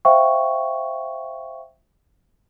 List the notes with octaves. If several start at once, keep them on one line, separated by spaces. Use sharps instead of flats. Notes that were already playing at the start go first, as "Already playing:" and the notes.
C5 E5 F5 G5 C#6